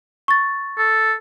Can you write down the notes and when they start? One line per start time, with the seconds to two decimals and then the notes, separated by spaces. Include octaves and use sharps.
0.28 C#6 A6
0.78 A4